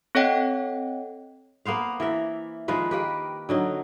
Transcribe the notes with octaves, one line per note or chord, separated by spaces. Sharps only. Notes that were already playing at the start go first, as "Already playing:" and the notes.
C4 A4 C#5 D#5 F#5 G5
A#3 B3 C5 F5
E3 A#4 E5
D#3 F3 G#3 B4
A#3 G4 B4
D3 F#3 D#4